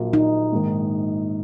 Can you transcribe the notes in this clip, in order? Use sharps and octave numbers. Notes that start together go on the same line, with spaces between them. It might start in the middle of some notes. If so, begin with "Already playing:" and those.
Already playing: A#1 A#2 F#3 A#3 F4
D#4
A#1 G#2 D#3